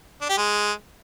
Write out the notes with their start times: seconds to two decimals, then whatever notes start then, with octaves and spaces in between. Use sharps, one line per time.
0.21 D4
0.29 G4
0.37 G#3